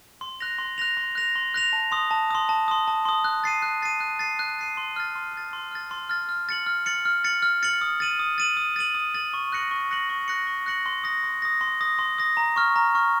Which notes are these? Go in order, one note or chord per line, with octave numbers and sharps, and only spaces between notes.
C6
F#6 A#6 F7
C6
F#6 A#6 F7
C6
F#6 A#6 F7
C6
F#6 A#6 F7
A5
C6 D#6
A5
C6 D#6
A5
C6 D#6
A5
C6 D#6
F#6
A6 C7 D#7
F#6
A6 C7 D#7
F#6
A6 C7 D#7
F#6
A6 C7 D#7
C6
F6 A6
C6
F6 A6
C6
F6 A6
C6
F6 A6
F6
A6 C#7 F#7
F6
A6 C#7 F#7
F6
A6 C#7 F#7
F6
A6 C#7 F#7
D#6
A6 D#7 F#7
D#6
A6 D#7 F#7
D#6
A6 D#7 F#7
D#6
A6 D#7 F#7
C#6
F#6 A#6 C#7 F#7
C#6
F#6 A#6 C#7 F#7
C#6
F#6 A#6 C#7 F#7
C#6
F#6 A#6 C#7 F#7
C6
D#6 A#6
C6
D#6 A#6
C6
D#6 A#6
C6
D#6 A#6
A#5
C#6 F6
A#5
C#6 F6